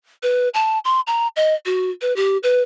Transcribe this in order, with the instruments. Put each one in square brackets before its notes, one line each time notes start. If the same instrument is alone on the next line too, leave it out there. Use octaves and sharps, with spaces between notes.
[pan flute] B4
A5
C6
A#5
D#5
F#4
B4
G4
B4